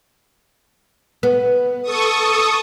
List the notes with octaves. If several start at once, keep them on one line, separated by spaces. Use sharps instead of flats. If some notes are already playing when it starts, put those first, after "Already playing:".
B3
A4 C#6 D#6